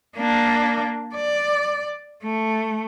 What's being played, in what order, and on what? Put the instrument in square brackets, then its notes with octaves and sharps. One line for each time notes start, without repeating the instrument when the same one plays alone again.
[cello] A#3 D4
D5
A3